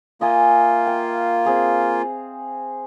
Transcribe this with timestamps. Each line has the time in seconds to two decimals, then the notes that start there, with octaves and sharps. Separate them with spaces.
0.21 A#3 F4 D#5 E5 G#5
0.87 G5
1.45 C4 G#4 F5